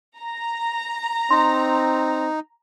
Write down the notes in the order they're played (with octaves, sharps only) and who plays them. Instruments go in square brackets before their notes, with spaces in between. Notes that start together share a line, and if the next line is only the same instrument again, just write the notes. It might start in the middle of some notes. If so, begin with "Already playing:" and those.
[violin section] A#5
[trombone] C4 [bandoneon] D#4 [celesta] C6